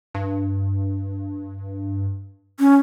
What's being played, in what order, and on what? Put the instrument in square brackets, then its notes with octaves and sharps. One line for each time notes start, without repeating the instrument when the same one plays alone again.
[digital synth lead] G2
[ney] C#4